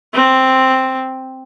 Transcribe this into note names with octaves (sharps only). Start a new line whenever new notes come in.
C4